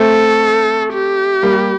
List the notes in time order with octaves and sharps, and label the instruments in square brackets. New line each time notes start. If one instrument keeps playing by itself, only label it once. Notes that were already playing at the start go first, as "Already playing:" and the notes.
Already playing: [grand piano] A3 C4 [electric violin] A4
[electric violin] G4
[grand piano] G3 A#3